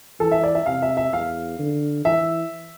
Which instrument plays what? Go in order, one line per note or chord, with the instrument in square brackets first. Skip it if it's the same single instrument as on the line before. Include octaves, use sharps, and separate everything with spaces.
[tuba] E3 [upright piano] A4
[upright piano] E5
D5
E5
[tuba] C3 [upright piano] F5
[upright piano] E5
E5
[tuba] E2 [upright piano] F5
[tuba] D3
[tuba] E3 [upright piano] E5